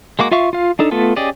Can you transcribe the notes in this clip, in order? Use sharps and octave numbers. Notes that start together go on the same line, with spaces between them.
G#3 A#3 F#4 D6
F4 E5 F5 C#6
F4 F5
D4 D#4 A4
A3 B3 F4 A4
C#4 G4 G#4 D5 D#5